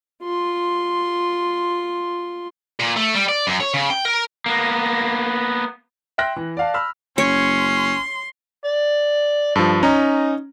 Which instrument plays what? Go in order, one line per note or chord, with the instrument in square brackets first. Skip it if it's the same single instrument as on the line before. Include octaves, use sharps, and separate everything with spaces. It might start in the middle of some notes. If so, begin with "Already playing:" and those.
[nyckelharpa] F4 C6
[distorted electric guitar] A#2
A3
G3
D5
F#2
C#5
C#3
G5
A#4
[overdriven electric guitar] A#3 B3
[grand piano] E5 G5 C6 F#6 A#6
E3
D5 F5 A5
B5 E6 F6
[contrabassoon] F#1 [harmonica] C#4 [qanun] C#5 [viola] C6
[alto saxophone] D5
[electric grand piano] G2 F3 [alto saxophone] A4
[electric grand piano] C#4 A#5 [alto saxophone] D#4